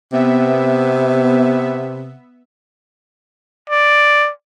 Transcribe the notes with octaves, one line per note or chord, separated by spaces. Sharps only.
C3 B3 E5
D5